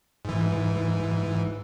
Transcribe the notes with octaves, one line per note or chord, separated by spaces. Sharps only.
G#2 E3